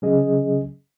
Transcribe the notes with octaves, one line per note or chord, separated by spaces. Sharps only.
C#3 F#3 C#4 G#4 D#5